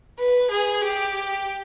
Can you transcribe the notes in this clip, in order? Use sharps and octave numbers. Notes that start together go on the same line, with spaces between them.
B4
G#4
G4